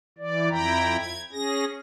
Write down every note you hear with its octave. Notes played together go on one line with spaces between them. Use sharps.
E3 D5
F2 E4 G5 A#5 B5
G#6
C#4 G#4 A#6